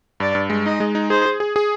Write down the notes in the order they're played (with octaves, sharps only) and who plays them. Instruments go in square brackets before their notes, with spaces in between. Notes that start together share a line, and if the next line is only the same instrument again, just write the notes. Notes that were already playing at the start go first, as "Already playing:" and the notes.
[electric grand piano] G2 [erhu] D5
[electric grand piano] G2
G#3
[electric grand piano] D#4 [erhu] D#5
[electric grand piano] G#3
D#4
[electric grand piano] G#4 [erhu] C5
[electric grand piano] G#4
G#4
G#4